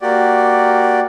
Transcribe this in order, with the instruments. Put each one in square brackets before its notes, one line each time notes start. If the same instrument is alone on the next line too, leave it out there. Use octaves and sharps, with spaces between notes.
[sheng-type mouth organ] A#3 F#4 G4 D5